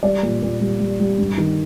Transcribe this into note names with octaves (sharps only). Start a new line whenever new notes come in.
G3 D5
A#2
A#2
G3
G3
G3
G2
D#3